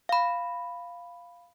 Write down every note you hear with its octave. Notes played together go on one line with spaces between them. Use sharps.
F5 B5